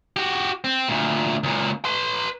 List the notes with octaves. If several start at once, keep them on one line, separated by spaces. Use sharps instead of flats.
F#4 G4
C4
D2 A#2
C#2 A#2
B4 C6